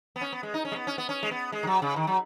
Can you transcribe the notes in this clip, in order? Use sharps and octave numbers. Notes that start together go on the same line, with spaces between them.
B3
C#4
B3
G#3
D#4
C#4
G#3
B3
C#4
B3
C#4
G#3
B3
G#3
D#3
F#3
C#3
D#3
F#3